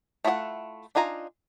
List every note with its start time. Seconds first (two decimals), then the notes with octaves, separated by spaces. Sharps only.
0.25 A3 E4 F4 G#4 F#5
0.95 D4 D#4 F4 G#5 A#5